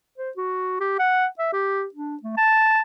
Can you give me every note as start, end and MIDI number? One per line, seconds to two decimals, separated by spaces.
0.18 0.30 72
0.37 0.77 66
0.80 0.94 67
0.99 1.26 78
1.39 1.50 76
1.53 1.85 67
1.94 2.16 62
2.23 2.35 57
2.37 2.80 81